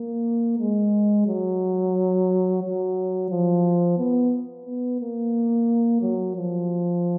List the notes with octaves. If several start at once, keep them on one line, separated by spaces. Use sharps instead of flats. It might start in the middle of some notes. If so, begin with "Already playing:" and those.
Already playing: A#3
G#3
F#3
F#3
F3
B3
B3
A#3
F#3
F3